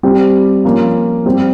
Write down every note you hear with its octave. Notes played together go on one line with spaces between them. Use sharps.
G3 C4 G4
F3 A#3 C#4
G3 C4 G4